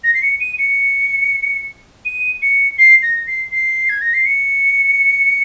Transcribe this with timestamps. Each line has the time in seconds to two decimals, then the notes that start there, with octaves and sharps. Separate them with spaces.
0.04 A#6
0.14 C7
0.22 C#7
0.40 D#7
0.58 C#7
2.05 D#7
2.42 C#7
2.78 C7
3.03 A#6
3.27 C7
3.52 C7
3.89 G#6
4.01 A#6
4.14 C7
4.26 C#7